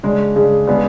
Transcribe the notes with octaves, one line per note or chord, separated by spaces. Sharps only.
C#3 G#3 D4
C#3 G#3 D4
C#3 G#3 B3 D4